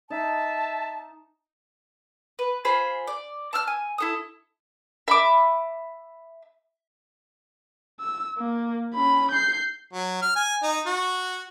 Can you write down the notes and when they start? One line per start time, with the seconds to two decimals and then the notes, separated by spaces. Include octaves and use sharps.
0.10 D#4 E5 A5
2.39 B4
2.65 F4 G#4 C5 B5
3.07 D5
3.53 A5 E6 F6
3.67 G#5
3.98 E4 A4 D#6
5.08 E5 B5 D6
8.00 E6
8.38 A#3
8.95 C#4 B5
9.32 G6 C7
9.93 F#3
10.22 F6
10.36 G#5
10.63 D#4
10.86 F#4